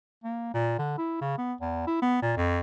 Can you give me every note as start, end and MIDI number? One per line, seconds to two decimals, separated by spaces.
0.24 0.50 58
0.54 0.78 46
0.78 0.93 50
0.98 1.18 64
1.21 1.38 49
1.38 1.54 59
1.61 1.83 40
1.87 1.98 64
2.02 2.19 59
2.22 2.36 46
2.37 2.60 41